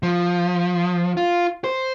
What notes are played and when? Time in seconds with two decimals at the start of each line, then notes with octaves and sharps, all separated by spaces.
0.03 F3
1.17 F4
1.64 C5